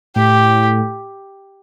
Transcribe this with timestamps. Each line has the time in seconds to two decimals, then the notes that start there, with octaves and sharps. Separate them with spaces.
0.16 A2 G4